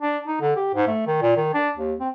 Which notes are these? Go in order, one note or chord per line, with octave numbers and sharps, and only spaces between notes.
D4
D#4
D3
G4
G#2
A3
D#3
A#2
D#3
D4
D#2
C4